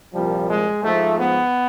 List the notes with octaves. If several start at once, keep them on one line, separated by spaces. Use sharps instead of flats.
C2 A#2 F3 G3
G#3
G#2 F3 A3
B3